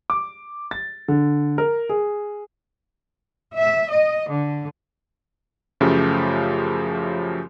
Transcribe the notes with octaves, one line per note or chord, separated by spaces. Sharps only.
D6
A6
D3
A#4
G#4
E5
D#5
D3
F#2 C#3 F3 A3 G4